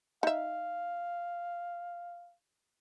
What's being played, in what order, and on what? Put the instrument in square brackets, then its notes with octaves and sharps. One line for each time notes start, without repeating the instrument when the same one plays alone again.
[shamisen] D#4 E5 [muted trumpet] F5